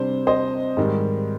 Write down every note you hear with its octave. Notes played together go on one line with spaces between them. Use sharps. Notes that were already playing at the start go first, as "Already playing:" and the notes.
Already playing: C3 G3 D4 C5
C5 D#5
G#2 D#3 G3